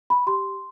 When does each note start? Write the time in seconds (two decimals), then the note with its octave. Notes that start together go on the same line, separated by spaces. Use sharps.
0.10 B5
0.27 G4 C6